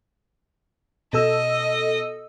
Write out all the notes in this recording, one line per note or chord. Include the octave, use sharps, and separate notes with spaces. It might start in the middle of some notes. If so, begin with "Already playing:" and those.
B2 A4 D#5 E6